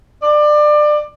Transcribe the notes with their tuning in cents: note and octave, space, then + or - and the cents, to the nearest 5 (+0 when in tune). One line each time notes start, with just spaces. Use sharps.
D5 +25